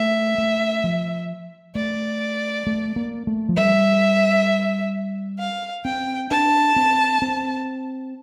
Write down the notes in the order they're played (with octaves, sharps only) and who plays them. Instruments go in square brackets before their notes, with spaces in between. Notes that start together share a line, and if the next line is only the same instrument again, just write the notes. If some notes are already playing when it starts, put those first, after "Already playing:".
Already playing: [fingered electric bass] A3 [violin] E5
[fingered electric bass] A3
F3
[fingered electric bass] A3 [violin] D5
[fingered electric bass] A3
A#3
A3
F3
[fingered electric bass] G3 [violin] E5
[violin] F5
[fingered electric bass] C4 [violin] G5
[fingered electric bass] D4 [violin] A5
[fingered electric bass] C4
C4